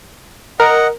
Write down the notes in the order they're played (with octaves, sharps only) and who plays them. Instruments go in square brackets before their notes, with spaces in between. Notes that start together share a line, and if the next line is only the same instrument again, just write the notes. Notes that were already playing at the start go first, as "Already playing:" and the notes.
[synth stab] A#4 [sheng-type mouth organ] D#5 F#5